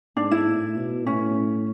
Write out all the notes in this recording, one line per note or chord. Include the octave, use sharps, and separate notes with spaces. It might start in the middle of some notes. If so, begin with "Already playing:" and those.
G#2 D4
E4
A2
B2
A2 C#4